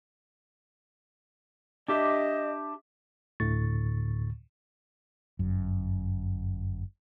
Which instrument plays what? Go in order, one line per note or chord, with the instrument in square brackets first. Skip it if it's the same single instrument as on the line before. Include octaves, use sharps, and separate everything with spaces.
[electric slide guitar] D4 G4 E5 [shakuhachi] D#5
[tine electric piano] D2 A2 D3 C#6 A6
[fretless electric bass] G1 F#2